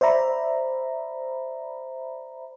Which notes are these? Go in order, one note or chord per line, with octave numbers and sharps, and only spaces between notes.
C5 D5 E5 A#5 B5